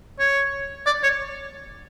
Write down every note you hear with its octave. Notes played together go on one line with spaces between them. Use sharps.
C#5
D5
C#5